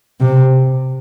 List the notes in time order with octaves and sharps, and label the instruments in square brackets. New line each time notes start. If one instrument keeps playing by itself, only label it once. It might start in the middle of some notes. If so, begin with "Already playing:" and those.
[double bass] C3